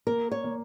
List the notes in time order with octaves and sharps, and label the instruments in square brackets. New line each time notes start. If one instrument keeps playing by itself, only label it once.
[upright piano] A#3 [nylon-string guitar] A#4
[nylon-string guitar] C#5
[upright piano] A#3